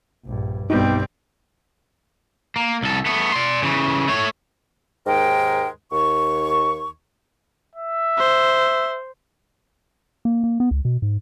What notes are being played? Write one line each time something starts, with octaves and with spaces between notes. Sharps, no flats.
A#1 G2
B1 G2 G3 B3 C4 D#4
A#3
C2 A4
A3 B3
D5 C6
C#3 E3
A3 C#5
D#2 G#2 G#3 A#4 G5
D#2 C#6
E5
C5
A#3
A#3
B3
C#2
B2
G#2